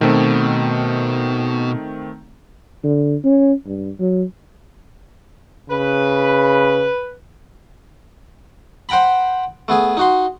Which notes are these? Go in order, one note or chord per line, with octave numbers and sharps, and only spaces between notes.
B2 D#3 A3 C4
D3
C#4
G2
F#3
C#3 B4
C5 F#5 G5 A#5 B5
A3 B3 G#4
D#4 F#4 C6